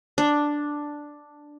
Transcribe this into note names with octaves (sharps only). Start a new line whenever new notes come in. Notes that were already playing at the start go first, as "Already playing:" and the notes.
D4